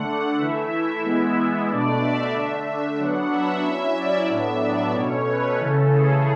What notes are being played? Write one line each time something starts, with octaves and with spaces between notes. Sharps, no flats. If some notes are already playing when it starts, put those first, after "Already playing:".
Already playing: D3 A3 D4 F#5
E3 A3 E4 E5
E3 G#3 B3 E4
B2 A3 D4 D5
E5
D3 A3 D4
E5
F#3 B3 D4 F#5
E5
F#3 C#4 E4 E5
D5
A2 F#3 B3 D4 E5
D5
B2 A3 C#4 C#5
B4
C#3 E3 A3 C#4 A4
G#4